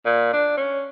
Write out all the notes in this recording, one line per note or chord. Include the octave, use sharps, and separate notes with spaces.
A#2
D4
C#4